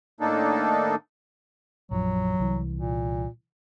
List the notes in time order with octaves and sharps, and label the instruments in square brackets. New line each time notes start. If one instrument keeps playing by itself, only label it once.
[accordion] A2 D#3 A#3 D4 D#4 A4
[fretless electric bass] A#1 F#2 F3 [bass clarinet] F#3
[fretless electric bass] C2 E3
[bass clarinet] A#2